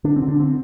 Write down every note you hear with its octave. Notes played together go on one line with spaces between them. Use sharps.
D3 D4
C4
D3
D4
C4